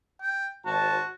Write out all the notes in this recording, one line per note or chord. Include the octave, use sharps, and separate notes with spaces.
G5
G#1 F#4 C5 A5